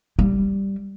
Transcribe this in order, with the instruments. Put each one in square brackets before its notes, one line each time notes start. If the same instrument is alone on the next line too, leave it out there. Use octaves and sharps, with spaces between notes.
[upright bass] G3